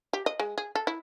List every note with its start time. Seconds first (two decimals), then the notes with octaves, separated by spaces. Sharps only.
0.13 G4
0.26 D#5
0.40 G#3
0.58 G#4
0.75 A4
0.87 E4